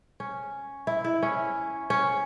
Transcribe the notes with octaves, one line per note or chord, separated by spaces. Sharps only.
C#4
E4
E4
C#4
C#4